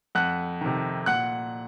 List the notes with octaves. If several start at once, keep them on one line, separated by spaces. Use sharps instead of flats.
F2 F#5 F#6
C3 D#3
A#2 F#5 F#6